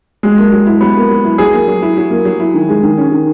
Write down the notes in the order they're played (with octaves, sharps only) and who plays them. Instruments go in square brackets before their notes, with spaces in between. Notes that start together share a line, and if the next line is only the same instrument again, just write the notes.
[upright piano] F#3 [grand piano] G#3
[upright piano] A#3
F#3
E4
[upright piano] F#3 [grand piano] B3
[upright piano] A#3
F#3
E4
[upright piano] F#3 [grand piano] G#4
[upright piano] A#3
F#3
E4
F#3
A#3
F#3
E4
D#3
G#3
D#3
C#4
D#3